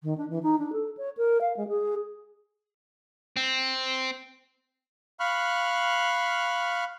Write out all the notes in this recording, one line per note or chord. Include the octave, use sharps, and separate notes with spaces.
D#3
D4
E3
D#4
D4
A4
C#5
A#4
F5
G#3
G#4
C4
F5 B5 C#6 F6 F#6